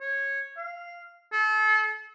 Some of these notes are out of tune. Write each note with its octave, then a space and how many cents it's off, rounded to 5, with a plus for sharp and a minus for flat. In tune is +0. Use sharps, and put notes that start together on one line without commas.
C#5 -10
F5 -10
A4 -35